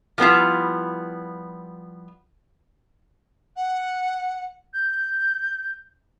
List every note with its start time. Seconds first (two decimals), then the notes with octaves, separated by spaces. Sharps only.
0.18 F3 G3 B3 C4 E4 F4
3.56 F#5
4.73 G6